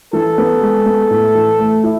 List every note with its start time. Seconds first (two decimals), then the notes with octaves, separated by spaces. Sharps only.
0.13 E3 A4
0.38 B3
0.62 G#3
0.86 B3
1.11 A2
1.35 E3
1.59 A3
1.84 E4